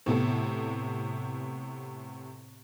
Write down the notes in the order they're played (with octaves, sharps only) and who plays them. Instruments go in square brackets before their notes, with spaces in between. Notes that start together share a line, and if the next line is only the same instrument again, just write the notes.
[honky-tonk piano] A2 C3 B3 A4